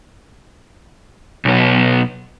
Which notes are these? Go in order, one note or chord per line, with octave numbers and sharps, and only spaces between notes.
B1 B3